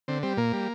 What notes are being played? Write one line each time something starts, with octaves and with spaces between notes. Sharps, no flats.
D3 C4
G3 C4
A#2 A#3
G3